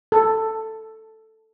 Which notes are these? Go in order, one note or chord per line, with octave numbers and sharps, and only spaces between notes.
A4